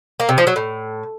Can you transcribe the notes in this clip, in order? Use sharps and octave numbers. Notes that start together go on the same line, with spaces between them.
A#3
C3
F3
F#3
A2